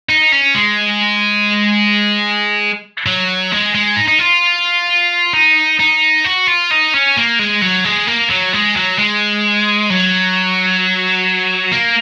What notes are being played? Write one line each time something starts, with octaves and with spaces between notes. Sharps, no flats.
D#4
C#4
G#3
F#3
G#3
G#3
D#4
D#4
F4
D#4
D#4
F#4
F4
D#4
C#4
A#3
G#3
F#3
G#3
A#3
F#3
G#3
F#3
G#3
F#3
A#3